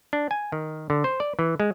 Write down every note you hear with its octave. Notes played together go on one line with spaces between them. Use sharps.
D4
G#5
D#3
D3
C5
D5
E3
G#3